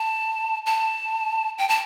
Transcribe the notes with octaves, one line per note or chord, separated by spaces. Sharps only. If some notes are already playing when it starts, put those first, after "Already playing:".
Already playing: A5
A5
G5
A5